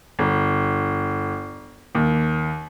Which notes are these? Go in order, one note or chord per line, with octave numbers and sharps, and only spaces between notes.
G1
D#2